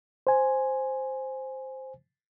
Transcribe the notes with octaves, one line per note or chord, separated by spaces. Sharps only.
C5 G#5